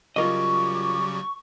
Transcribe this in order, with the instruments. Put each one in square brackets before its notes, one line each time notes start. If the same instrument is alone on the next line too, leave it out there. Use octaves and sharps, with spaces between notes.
[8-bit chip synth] C#3 F#3 G3 [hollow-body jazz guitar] F4 A#4 D#5 [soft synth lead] C#6 [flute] D6